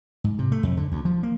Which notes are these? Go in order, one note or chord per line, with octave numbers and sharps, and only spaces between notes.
G#2
C3
A3
F2
D3
D2
F3
A#3